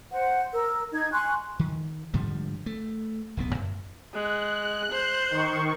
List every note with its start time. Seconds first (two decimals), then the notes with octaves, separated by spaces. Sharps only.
0.11 C5 F#5
0.53 A#4 E6
0.92 D#4 G#6
1.12 G#5 C6 C#6 F#6
1.59 D#3
2.14 G#2 D3 F3 G3
2.66 A3
3.37 D1 B1 B3
3.54 F#2
4.14 G#3 F#6
4.92 C5
5.31 D#3 C#6